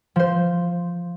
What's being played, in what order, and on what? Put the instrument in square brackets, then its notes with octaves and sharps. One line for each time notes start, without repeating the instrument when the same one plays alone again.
[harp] F3 C5